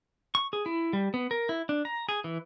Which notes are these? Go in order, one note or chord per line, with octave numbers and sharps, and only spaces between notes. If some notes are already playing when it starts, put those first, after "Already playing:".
C#6
G#4
E4
G3
B3
A#4
E4
D4
A#5
G#4
E3